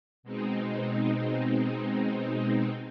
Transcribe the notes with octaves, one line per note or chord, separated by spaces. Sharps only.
B2 G#3 C4 D#4